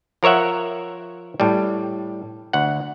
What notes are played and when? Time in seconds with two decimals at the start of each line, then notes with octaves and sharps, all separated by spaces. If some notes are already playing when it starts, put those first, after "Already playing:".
0.23 F3 A#4 C#5 E5 F#5
1.40 A2 G3
2.53 D2 F#5